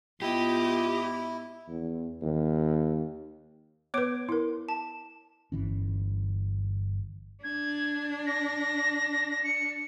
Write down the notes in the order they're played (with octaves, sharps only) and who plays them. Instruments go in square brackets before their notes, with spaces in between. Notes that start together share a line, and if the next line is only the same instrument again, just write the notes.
[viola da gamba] G#2 B3 D#5 [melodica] E4 [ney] F4 [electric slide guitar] G4
[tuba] E2
D#2
[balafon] B3 B4 [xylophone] C#5 D6 D7
[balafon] E4 A#4
[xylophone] A5
[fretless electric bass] G1 E3 C#4
[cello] D4 [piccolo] G#6
[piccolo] A#6
C#7